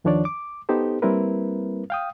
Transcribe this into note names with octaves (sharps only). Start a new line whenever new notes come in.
D#2 D#3 F3 D4 C#5 D5
D6
B3 D#4 G4 A4 C5
G3 A#3 C4 E4 A#4 B4
F5 G5 D#6